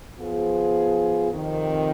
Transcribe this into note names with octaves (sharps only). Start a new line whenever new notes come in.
F3 B3 F4 G#4 C5
F2 C3 D#3